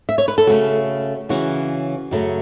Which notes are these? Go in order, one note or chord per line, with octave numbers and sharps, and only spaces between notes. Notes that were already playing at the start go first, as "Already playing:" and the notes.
E5
C#5
B4
A4
C#3 A3 C#4 F#4
C#3 E3 C#4 F#4
F#2 C#3 F#3 A3